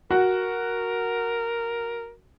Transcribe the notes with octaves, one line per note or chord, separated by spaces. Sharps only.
F#4 A#4